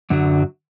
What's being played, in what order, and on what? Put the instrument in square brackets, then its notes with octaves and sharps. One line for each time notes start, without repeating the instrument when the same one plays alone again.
[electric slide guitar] F#2 D3 F#3